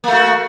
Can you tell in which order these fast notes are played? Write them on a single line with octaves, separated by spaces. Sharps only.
A#3 A3 F#4